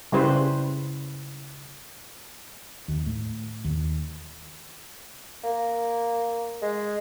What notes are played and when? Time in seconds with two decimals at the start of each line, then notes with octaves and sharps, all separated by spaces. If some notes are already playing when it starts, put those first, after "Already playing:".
0.12 C#3 G3 E4 B4 C5
2.88 D#2
3.06 A2
3.65 D#2
5.44 A#3
6.62 G#3